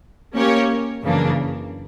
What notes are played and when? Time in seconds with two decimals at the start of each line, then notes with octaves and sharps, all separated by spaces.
0.34 A#3 C#4 G4 A#4 C#5
1.02 F#2 C#3 E3 A#3 D4